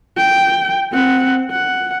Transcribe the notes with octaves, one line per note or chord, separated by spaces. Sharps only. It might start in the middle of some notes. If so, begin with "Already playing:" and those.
G5
C4 F#5
F#5